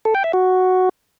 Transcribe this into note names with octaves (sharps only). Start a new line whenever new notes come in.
A4
G5
E5
F#4